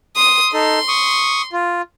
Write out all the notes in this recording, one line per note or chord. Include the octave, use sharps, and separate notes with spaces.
C6 D#6
D#4 A4 C6
C#6 D#6
F4